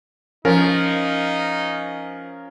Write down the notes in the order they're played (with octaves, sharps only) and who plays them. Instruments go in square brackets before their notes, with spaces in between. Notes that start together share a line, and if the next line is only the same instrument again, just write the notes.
[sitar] F3 [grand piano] C#4 [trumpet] D#4 [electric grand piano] A#4